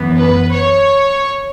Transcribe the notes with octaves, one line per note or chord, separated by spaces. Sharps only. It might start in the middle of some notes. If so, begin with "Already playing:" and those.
Already playing: F#2 E3 B3
B4
C#5